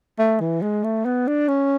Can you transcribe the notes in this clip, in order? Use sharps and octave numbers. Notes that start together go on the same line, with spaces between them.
A3
E3
G#3
A3
B3
D4
C#4